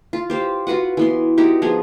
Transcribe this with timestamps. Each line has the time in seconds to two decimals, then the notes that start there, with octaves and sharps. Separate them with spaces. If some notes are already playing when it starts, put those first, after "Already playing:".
0.13 F4
0.30 G4 C5 F5
0.67 F4 F#4 B4 F#5
0.97 E3 B3 C6
1.38 D#4 E4 F#4 G4
1.62 F3 B3 G#4 A#5